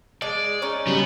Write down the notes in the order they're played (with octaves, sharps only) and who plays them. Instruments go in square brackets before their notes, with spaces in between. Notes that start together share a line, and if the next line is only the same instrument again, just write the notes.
[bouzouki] G#3 [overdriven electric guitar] D5
[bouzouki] C#4 D#4
[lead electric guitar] C#3 [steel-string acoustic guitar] F#3 G3 [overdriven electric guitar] B3